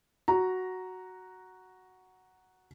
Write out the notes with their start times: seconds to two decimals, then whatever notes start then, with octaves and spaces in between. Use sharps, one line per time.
0.28 F#4 A#5